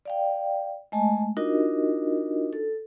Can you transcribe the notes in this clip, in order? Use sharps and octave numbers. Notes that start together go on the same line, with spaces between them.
D5 F5 G5
G#3 A3 D#5 G#5 A5
D4 D#4 F4 F#4 A#4 D#5
A4